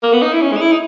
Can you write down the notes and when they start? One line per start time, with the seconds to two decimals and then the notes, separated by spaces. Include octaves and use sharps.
0.03 A#3
0.13 B3
0.22 D#4
0.33 E4
0.42 C#4
0.52 G#3
0.57 D#4
0.62 E4
0.72 D#4